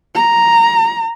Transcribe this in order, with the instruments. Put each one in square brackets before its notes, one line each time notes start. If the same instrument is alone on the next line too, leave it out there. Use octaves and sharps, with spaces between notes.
[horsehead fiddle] A#5